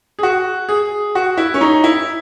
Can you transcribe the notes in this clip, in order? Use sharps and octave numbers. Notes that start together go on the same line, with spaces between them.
G#4
F#4
G#4
F#4
E4
C#4
D#4
E4